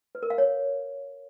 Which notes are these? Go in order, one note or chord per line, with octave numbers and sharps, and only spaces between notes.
B4
A#4
F5
C#5